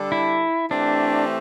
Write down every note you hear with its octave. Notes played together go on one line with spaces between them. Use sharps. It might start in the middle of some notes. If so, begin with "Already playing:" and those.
Already playing: D3 G3 D4 A4
E4
E3 A3 C4 D4 G4